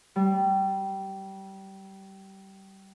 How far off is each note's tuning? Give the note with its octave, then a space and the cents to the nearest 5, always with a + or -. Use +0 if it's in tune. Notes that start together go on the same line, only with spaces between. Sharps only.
G3 -20